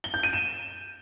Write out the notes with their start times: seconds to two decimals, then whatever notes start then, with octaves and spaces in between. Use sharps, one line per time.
0.04 G7
0.14 G6
0.23 D#7
0.33 E7